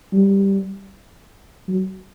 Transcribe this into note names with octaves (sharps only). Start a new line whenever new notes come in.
G3
F#3